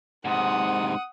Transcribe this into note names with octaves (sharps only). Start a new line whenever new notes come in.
G#2 C3 F#5 D#6